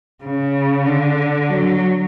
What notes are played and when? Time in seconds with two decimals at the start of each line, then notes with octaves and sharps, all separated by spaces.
0.24 C#3
0.86 D3
1.49 F#3